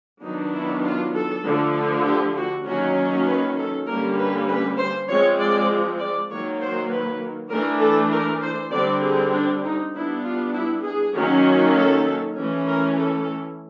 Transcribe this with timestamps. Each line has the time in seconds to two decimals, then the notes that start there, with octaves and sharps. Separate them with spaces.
0.24 D#3 F#3 B3 D4 D#4
0.54 E4
0.85 F4
1.15 A4
1.45 D3 F3 A3
2.06 G4
2.36 F#4
2.66 D#3 F#3 A#3 C#4 F#4
3.27 B4
3.57 A4
3.87 D3 G3 A#3 C#4 A#4
4.18 B4
4.49 B4
4.79 C5
5.09 F3 G#3 C4 C#5
5.39 D5
5.99 D5
6.30 D#3 F#3 A#3 C#5
6.61 C5
6.90 B4
7.52 E3 A3 D4 A#4
7.81 A4
8.11 A#4
8.42 C5
8.72 D3 G3 C4 D5
9.02 G#4
9.33 D4
9.64 D#4
9.93 G3 B3 D4 E4
10.24 F4
10.54 E4
10.85 G#4
11.14 D#3 F#3 A#3 C#4
11.76 A4
12.37 E3 A3 C#4
12.67 A#4
12.97 A4